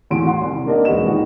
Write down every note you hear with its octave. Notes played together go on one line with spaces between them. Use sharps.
E2 A2 F#4 C6 D7
F#5 C6
C2
A#3 D4 A#4 D#5
E1 G#3 B3 F#4 E7
A#2 D#3 D#4 F#4